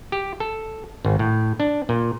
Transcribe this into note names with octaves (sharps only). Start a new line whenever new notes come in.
G4
A4
G#1
A2
D4
A#2